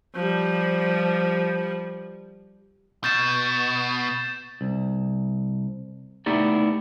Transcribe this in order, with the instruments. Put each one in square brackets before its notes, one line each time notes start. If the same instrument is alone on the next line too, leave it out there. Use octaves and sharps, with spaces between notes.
[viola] F3 G3
[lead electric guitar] B2 [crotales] G6 A6 E7
[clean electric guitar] C2
A3 B3 D#4 E4 G4 D5